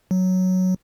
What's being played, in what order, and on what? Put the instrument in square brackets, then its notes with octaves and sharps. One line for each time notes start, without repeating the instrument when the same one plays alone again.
[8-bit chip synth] F#3